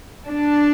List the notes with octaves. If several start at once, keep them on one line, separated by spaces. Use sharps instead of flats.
D4